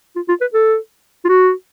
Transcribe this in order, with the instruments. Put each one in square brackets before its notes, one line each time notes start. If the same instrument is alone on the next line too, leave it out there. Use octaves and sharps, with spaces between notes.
[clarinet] F4
F4
B4
A4
F4
F#4